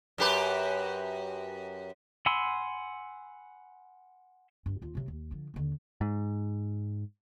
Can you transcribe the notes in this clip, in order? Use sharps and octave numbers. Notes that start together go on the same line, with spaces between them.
F#2 G4 B4
F#5 G#5 B5 C6 E6
G2
D#2 F4
C3 F#3
D#2
D3 F3
D#2 D3
G#2